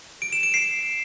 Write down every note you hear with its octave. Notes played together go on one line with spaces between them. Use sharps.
D7
E7
D7
C7